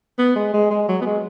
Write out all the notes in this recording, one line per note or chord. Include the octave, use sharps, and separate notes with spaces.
B3
G#3
G#3
G#3
F#3
B3
G#3